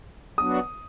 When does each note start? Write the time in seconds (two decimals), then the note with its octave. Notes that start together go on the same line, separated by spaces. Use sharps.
0.38 F#3 B3 D4 F#4 D#6